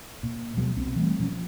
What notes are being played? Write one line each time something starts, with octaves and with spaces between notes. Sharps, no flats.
A#2
D#1 B2 F#3 G#3
B1 B2 C4
E3 G3 A3 C4
A#2 F3 C4 C#4